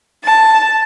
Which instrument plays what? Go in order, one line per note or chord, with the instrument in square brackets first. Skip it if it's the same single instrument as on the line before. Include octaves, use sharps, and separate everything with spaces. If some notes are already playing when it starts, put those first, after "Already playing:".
[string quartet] A5